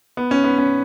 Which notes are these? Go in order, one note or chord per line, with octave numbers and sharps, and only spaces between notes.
B3
C#4
B3
C#4